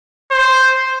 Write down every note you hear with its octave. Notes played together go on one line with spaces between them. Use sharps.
C5